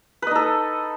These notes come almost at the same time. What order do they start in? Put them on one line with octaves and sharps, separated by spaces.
B4 D#5 D#4 A4